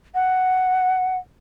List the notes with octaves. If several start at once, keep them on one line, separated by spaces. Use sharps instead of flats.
F#5